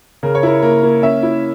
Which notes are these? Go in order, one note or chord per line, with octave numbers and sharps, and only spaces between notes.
C#3 A#4
C#5
E4 A#4
A#3 A#4
A#3
C#4 E5
E4